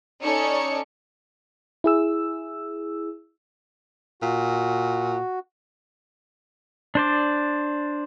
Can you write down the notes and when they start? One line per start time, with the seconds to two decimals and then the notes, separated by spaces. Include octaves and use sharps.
0.21 C#4 D#4 A4 C#5 D5 C#7
1.84 E4 G#4 E6
4.22 A#2 F#4
6.95 D4 C5 D5